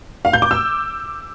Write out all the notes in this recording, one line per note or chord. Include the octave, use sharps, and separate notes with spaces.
F5
G6
D6
E6